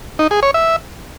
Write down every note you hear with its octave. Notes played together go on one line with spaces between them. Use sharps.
D#4
G#4
C#5
E5